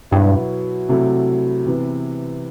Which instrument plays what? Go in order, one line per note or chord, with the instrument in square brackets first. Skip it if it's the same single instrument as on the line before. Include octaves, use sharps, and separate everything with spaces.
[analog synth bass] G2 [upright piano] B2 F#3 B3 E4
[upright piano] C3 F#3 A3 E4
C3 E3 B3